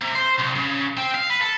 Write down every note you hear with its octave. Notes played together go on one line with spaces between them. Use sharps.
C3
C5
C2
C#3
C4
F5
B4
A4